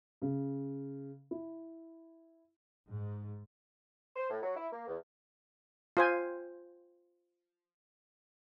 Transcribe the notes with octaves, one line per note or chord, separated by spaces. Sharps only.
C#3
E4
G#2
C5
A2
F#3
E4
A#3
E2
F4 C5 G#5